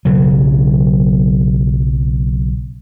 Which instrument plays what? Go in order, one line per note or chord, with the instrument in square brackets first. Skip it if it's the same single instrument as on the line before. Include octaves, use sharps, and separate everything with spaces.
[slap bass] B1 C#3 F#3